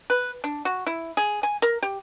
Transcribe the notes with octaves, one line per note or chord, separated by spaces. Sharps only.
B4
D4
F#4
E4
G#4
G#5
A#4
G4